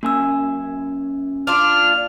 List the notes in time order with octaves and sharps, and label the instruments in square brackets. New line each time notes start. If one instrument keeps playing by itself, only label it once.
[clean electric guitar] F#2 C#4 G#5 [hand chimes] A#3 E6
[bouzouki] D4 F4 [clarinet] F6